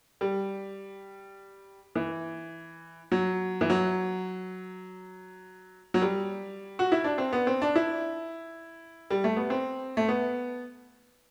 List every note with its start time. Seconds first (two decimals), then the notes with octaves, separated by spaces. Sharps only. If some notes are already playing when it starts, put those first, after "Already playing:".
0.21 G3
1.96 E3
3.12 F#3
3.61 E3
3.70 F#3
5.94 F#3
6.02 G3
6.79 F#4
6.92 E4
7.04 D4
7.18 C4
7.33 B3
7.47 C4
7.62 D4
7.76 E4
9.11 G3
9.24 A3
9.36 B3
9.50 C4
9.97 A3
10.08 B3